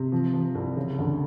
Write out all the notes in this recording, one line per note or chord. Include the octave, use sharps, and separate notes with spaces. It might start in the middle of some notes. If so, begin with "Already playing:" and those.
Already playing: C3
F3
F3
C2
C#3
D2